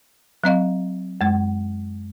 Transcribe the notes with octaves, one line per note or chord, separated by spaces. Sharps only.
F#3 C4 D#5 F5
F#2 G#3